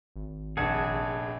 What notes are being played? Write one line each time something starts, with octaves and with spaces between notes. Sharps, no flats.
G#1
F1 A#1 G#4 F#5 A5 G#6